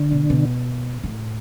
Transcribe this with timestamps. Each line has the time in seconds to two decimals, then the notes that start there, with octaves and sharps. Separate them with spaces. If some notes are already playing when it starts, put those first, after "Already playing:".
Already playing: D3
0.11 B2
0.30 B2
1.04 A2